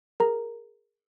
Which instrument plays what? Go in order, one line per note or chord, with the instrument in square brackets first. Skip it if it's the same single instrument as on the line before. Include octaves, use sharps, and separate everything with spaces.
[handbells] G#4 A#4 A#5